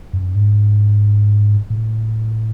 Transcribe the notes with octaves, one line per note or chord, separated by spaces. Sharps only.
F#2
G#2
A2